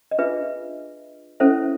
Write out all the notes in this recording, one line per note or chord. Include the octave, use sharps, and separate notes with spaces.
D#5
D4 F4 G#4 B4 E5
C#4 E4 A4 C5 E5